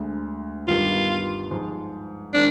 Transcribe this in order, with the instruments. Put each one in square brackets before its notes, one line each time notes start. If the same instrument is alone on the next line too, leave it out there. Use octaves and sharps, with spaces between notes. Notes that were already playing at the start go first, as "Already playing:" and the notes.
Already playing: [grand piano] D2 D3 G#3
[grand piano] G1 G2 D#3 G3 B3 [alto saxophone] F4
[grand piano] G#2 F3 G#3
[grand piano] D#3 G#3 C4 [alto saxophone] D4